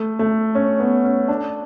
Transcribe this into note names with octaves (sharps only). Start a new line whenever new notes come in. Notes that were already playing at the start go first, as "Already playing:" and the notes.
Already playing: A3
A3
C#4
B3
C#4
D4